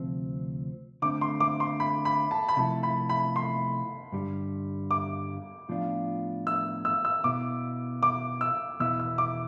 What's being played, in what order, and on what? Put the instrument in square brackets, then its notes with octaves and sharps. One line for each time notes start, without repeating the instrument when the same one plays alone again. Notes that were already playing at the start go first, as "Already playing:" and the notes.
Already playing: [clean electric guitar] D2 C3 F3 C4
[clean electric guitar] D3 A3 C4 [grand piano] D6
[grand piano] C6
D6
C6
B5
B5
A5
B5
[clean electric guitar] C3 F3 A3 E4 [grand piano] A5
[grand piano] B5
B5
C6
[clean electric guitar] G2 D3 G3
[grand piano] D6
[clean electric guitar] A2 F3 B3 D4 F4
[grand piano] E6
E6
E6
[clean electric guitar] B2 B3 E4 [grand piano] D6
[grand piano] D6
E6
[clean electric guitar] E2 B2 B3 E4 [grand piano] E6
[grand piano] E6
D6